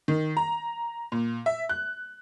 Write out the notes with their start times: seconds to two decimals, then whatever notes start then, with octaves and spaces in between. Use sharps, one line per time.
0.08 D#3
0.37 A#5
1.12 A#2
1.46 E5
1.69 F#6